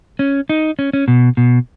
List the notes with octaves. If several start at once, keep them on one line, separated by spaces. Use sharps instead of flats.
C#4
D#4
C#4
C#4
B2
B2